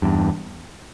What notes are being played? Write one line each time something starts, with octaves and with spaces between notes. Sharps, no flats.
E2 G2